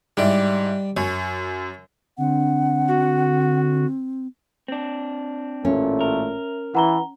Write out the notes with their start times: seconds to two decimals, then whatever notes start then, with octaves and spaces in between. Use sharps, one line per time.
0.17 G#2 G3 E4 D5
0.97 F#2 C#5
2.18 D3 C4 F#5
2.87 F#4
4.68 C4 D4
5.65 A1 A#2 A3 C#4 G#5
6.01 A#4 E5
6.75 E3 F#5 A#5 G7